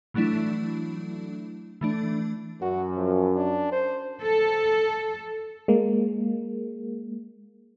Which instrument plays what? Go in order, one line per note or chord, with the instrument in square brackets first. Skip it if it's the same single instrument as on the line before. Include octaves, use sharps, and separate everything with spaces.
[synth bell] E3 F#3 A3 D4 E4
E3 A3 D4
[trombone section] F#2 [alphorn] F#4
[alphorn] F3
D4
C5
[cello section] A4
[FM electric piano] G#3 A#3